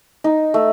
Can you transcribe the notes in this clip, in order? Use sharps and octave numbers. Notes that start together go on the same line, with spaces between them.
D#4
A3